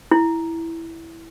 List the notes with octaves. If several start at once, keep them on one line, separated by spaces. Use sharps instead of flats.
E4